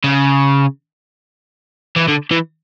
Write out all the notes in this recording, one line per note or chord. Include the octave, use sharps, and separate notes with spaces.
C#3
E3
D3
E3